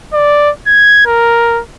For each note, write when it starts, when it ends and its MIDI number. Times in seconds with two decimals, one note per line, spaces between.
0.13 0.51 74
0.67 1.03 92
1.06 1.61 70